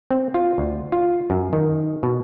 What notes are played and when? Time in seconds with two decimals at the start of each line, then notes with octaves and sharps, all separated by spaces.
0.11 C4
0.34 F4
0.58 D2
0.92 F4
1.30 F#2
1.53 D#3
2.03 B2